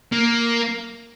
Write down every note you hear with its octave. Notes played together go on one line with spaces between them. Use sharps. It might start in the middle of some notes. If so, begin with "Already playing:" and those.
A#3